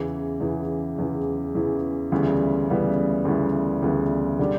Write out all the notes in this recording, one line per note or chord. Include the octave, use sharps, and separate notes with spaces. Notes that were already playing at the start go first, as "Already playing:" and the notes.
Already playing: E2 C#3 E3
E2 C#3 E3
E2 C#3 E3
E2 C#3 E3
D2 C#3 E3 G3 B3
D2 C#3 E3 G3 B3
D2 C#3 E3 G3 B3
D2 C#3 E3 G3 B3
D3 G3 D4